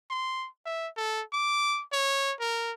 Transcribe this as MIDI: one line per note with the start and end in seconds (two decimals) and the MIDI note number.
0.10 0.47 84
0.66 0.88 76
0.97 1.22 69
1.33 1.82 86
1.93 2.33 73
2.40 2.72 70